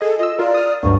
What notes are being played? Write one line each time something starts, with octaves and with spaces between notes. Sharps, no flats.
G#4 A4 D#5
F4 D#5 E6
F4 A#4 D5
D#6 F6
D2 G2 F#3 C#6